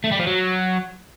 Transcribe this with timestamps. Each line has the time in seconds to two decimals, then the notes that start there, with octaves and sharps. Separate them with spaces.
0.04 A3
0.12 G3
0.19 F3
0.27 F#3